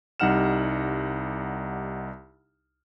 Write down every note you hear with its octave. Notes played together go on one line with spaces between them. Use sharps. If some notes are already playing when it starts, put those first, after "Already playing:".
C2 G3 D#4 F#5 F6 E7